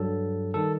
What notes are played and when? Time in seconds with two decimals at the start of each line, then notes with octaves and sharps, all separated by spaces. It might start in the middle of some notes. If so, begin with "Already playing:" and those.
Already playing: G2 F#3 A4
0.54 D#3 G3 A4